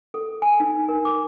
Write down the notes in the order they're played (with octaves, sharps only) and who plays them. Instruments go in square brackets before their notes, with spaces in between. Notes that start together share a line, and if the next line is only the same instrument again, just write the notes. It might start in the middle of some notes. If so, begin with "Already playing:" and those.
[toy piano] A4
G#5
D#4
A#4
D6